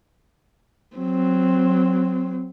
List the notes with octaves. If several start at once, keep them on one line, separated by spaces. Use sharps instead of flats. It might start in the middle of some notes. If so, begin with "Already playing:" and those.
F#3 C4